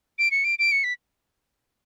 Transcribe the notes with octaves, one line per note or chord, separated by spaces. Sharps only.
D7
C#7
D7
D7
C#7
B6